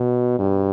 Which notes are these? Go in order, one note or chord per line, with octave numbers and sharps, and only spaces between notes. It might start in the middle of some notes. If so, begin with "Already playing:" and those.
Already playing: B2
G2